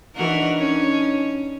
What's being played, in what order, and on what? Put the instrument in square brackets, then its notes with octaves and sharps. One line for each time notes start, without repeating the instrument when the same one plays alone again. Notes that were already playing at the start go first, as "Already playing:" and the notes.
[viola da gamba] E3 F#4 A#4 [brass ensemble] D4 D#4
[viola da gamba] C#4